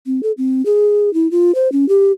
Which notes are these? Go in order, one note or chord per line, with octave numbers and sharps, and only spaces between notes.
C4
A4
C4
G#4
E4
F4
C5
C#4
G4